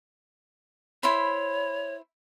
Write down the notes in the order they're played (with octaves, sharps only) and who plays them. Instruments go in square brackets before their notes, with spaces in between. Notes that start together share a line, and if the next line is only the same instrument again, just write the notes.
[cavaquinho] E4 C5 B5 [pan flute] C#5